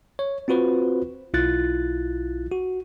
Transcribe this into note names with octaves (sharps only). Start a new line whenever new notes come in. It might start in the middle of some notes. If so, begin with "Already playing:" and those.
C#5
C4 F4 F#4 B4 C5
B1 E4 F4 F#6 A6
F#4